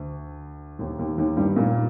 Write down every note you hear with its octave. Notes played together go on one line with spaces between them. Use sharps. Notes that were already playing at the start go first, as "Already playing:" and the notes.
Already playing: D2
D#2 D#3
D#2 D#3
D#2 D#3
G2 G3
A#2 A#3